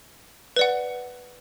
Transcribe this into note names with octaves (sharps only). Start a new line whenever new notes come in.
B4 D5 F#5